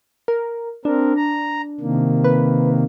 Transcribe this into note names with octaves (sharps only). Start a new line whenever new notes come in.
A#4
C4 D4 A#4
A#5
C3 D#3 A#3
B4